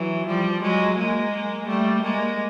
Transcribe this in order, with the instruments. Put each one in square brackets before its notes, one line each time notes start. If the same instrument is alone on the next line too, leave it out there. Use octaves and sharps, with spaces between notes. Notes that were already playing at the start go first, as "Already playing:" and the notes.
Already playing: [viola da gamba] E3 F#3
F3 G3
F#3 G#3
G#3 A#3
G3 A3
G#3 A#3